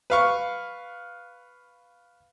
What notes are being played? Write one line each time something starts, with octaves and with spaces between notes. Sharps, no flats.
B4 F5 C#6